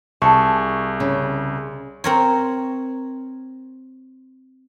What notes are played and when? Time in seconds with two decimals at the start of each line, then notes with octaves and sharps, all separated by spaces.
0.22 C2 G#4 A5 C#6
1.00 C#3
2.04 C4 A#4 C#5